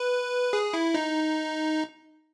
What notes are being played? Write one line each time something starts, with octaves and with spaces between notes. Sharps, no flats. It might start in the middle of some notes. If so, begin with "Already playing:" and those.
Already playing: B4
G#4
E4
D#4